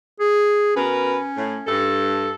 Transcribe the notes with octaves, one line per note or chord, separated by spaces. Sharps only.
G#4
B2 C#4 A#4 B4
A2
G2 A4